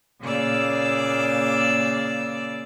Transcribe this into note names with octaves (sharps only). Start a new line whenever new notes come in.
A#2 C#3 A#3 D5 D6 E6